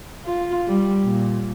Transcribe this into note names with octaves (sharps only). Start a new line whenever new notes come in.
F4
G3
A#2